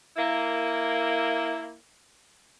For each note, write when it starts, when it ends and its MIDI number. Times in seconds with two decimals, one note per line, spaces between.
0.17 1.76 58
0.17 1.76 64